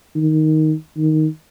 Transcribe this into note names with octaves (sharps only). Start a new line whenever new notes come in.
D#3
D#3